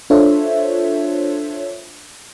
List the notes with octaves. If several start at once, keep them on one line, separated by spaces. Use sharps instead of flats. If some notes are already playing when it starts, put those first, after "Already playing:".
D4 F4 A4 C5 C#5 E5